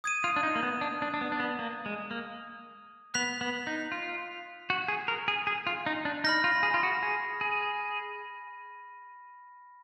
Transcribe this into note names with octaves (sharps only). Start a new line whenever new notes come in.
D#6 G#6 D#7
F4
D4
D#4
A#3
B3
D4
D4
D4
B3
D4
B3
A#3
G#3
A#3
B3 F#6 B6 F7
B3
D#4
F4
F#4
G#4
A#4
G#4
G#4
F4
D#4
D4
D#4 B5 F6 A#6
F4
G#4
F4
F#4
G#4
G#4